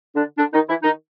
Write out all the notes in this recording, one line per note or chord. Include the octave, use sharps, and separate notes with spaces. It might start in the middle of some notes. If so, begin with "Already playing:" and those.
D3 D4
D3 D4
D#3 D#4
E3 E4
D#3 D#4